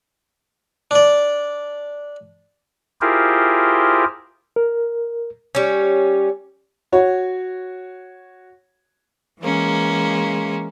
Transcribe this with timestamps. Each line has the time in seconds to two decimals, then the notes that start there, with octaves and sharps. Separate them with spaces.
0.91 D4 D5
3.01 E4 F4 G4 G#4 A#4 C5
4.56 A#4
5.55 G3 C#4
6.92 F#4 C#5
9.41 E3 G#3 A#3 C#4